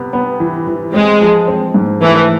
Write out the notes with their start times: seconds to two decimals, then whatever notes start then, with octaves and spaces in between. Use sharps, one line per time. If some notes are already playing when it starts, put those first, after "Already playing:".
Already playing: C3 B3
0.13 B3
0.40 E3
0.67 E3
0.94 G#3 C4
1.21 F3
1.48 C4
1.74 G#2
2.02 E3 A3